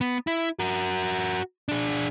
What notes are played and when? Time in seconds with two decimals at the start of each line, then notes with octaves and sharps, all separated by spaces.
0.01 B3
0.27 E4
0.59 F#4 A#4
1.69 D4 G#4